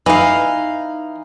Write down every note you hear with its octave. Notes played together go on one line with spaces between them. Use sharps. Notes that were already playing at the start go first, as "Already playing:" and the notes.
E3 D#4 F5